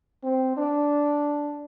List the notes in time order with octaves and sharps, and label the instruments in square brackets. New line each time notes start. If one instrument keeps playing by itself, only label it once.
[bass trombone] C4
D4